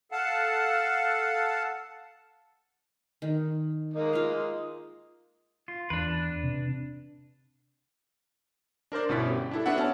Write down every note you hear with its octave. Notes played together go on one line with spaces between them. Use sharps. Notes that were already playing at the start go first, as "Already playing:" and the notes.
A4 F5 F#5 A5
D#3
G#3 A#3 D#4
F4 F5
F4
E2 D4 B4
C3
D4 A#4 C5 D5
G1 B2 C#4 E4 B6
G4
D4 E4 A4
B3 C4 D4 F#4 E5 F#5
C#4 A5